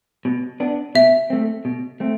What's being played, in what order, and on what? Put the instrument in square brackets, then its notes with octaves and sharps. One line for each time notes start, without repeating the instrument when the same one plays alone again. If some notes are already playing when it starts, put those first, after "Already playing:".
[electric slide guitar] B2
B3 D4
[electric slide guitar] B2 [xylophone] E5
[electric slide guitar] A3 C4
B2
A3 C4